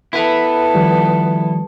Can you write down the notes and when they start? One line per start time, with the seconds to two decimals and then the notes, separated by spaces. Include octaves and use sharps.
0.13 B3 E4 A4 B4
0.74 D#3 F3 G3